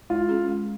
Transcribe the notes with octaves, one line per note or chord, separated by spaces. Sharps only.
G#3 F4
C#4 G#4
G#3